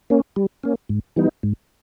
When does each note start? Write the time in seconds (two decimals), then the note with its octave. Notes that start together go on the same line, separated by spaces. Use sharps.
0.10 A#3 C#4
0.36 G3
0.63 A#3 C#4
0.89 G#2
1.16 E3 G3 B3 D#4
1.43 G#2